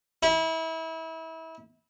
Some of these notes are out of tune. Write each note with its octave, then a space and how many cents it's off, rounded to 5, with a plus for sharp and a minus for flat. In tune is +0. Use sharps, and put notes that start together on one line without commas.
E4 -30